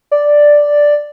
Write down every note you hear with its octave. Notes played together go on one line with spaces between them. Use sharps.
D5